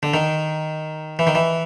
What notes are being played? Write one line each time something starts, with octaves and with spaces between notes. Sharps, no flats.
D3
D#3
E3
D#3
E3